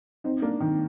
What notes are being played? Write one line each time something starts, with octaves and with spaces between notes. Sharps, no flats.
C4 D#4
A#3 D4
D#3